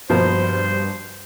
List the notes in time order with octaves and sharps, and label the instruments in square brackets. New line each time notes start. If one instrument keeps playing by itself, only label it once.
[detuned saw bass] G2 [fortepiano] B2 F3 A#3 [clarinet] C5